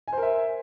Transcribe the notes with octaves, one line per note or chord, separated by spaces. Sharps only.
A#4 C5 E5 G#5